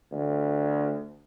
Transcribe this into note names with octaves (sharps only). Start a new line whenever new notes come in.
D2